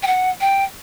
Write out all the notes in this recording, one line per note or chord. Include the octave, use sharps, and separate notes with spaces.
G5
F#5
G5